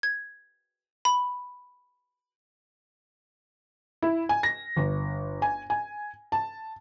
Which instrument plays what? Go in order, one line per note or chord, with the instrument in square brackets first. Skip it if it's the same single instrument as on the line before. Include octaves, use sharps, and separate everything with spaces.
[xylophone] G#6
B5
[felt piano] E4
G#5
A#6
G1
G#5
G#5
A5